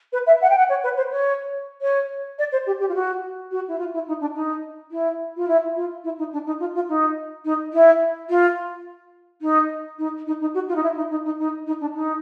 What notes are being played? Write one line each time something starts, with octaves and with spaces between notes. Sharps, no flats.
B4
E5
F#5
G5
F#5
C#5
B4
C5
C#5
C#5
D5
C5
G4
G4
F4
F#4
F#4
E4
F4
E4
D#4
D4
D#4
E4
F4
E4
F4
E4
D#4
D4
D#4
F4
F4
D#4
D#4
E4
F4
D#4
D#4
D#4
D#4
F#4
F4
D#4
E4
D#4
D#4
D#4
D#4
D#4
D4
D#4